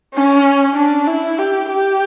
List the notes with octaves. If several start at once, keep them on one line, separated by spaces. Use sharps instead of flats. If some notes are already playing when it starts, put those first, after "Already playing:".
C#4
D4
E4
G4
G4